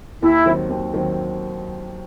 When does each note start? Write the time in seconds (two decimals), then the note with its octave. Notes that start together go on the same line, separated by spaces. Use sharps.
0.22 D#2 E4
0.46 D#3 F#3 C4
0.70 D#2
0.94 D#3 F#3 C4